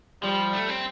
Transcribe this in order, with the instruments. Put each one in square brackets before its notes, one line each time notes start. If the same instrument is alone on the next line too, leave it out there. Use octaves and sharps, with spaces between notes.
[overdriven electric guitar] F3 [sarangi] G3
[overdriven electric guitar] A3
C4